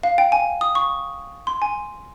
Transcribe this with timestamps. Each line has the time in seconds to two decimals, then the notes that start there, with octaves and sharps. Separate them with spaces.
0.03 F5
0.18 G5
0.32 G#5
0.61 D#6
0.75 C#6
1.47 C6
1.62 G#5